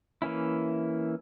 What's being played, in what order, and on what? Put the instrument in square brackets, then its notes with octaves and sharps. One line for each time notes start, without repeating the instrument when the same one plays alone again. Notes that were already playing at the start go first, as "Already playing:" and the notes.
[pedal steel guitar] E3 A#3 C#4 E4